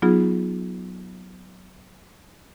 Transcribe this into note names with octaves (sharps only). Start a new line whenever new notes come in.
F#3 B3 D#4 F4 G#4